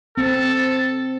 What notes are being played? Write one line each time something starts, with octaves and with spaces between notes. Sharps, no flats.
C4 A4